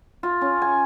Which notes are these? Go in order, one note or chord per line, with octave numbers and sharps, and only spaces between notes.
F4
C#4
G#5